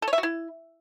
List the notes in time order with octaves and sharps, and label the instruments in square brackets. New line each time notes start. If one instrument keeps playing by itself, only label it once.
[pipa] A4
C#5
E5
F#4
E4